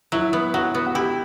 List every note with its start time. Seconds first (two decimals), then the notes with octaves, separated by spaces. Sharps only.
0.12 F#3 E4
0.33 B3
0.54 F#3 F#4
0.75 B3
0.87 F#4
0.95 E4 G4